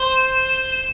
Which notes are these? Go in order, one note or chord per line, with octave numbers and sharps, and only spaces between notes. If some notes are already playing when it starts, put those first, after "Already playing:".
Already playing: C5